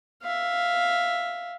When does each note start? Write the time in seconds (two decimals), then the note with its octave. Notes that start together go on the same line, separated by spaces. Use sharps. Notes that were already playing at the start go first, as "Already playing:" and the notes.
0.22 E5 F5